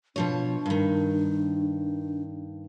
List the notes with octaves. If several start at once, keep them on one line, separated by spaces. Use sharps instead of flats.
B2 F3 D4 C#5
G2 D#3